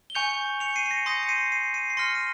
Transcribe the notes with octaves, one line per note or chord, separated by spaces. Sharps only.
G7
G#5 C#6 G6 C#7 F7
C#7 F7
C7 D#7
D#7
A#6 C#7
C6 D#6 G6 A#6 C#7
C#7
C7 D#7
C7 D#7
C7 D#7
C7
C6 F6 A#6 C#7
D#7